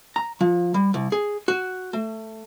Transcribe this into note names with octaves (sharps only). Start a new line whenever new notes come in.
A#5
F3
G3
C2
G#4
F#4
A3